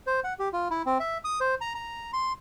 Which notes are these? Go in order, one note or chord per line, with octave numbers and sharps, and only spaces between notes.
C5
F#5
G4
F4
E4
C4
E5
D#6
C5
A#5
A#5
C6